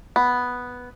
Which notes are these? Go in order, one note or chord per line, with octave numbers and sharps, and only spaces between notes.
B3